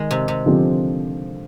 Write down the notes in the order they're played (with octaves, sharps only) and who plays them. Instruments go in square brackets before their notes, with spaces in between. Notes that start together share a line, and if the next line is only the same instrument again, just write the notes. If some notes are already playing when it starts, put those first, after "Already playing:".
Already playing: [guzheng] D#3 G#3
C3
C3
[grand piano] D3 F3 C4 G4 C5